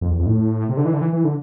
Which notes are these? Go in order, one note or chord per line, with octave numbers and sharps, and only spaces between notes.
F2
E2
F2
A2
C3
D3
E3
D3
E3
E3
D3